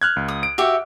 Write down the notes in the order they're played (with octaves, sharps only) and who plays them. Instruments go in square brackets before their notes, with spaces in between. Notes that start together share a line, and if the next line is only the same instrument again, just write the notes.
[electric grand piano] F6 F#6 G#6
C#2
[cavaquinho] D#6
[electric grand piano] D7
[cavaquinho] F#4 G4 E5